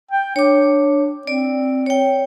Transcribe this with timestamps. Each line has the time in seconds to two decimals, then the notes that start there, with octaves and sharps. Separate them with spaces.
0.11 G5
0.36 D4 C#5 D6
1.27 C4 D5
1.86 C#5 G5